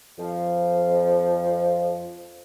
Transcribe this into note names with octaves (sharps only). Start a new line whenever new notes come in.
F2 F3